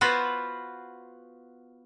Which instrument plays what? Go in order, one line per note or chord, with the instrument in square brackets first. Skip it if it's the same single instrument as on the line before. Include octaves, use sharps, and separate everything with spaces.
[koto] B3 F4 F#4 B4 C5